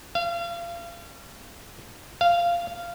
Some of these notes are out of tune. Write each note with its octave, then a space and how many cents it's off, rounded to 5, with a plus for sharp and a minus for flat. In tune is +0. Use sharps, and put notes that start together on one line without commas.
F5 -35
F5 -15